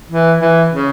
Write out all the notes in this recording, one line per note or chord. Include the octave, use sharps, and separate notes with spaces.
E3
E3
C#3